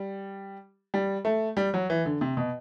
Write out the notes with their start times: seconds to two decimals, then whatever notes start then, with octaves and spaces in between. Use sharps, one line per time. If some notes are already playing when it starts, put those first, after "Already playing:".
Already playing: G3
0.94 G3
1.25 A3
1.57 G3
1.74 F#3
1.90 E3
2.06 D3
2.21 C3
2.37 B2